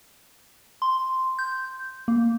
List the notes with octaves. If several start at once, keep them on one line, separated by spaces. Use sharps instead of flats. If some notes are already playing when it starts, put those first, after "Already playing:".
C6
G6
A#3